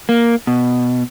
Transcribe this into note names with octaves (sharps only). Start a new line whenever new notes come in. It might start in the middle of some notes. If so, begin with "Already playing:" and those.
A#3
B2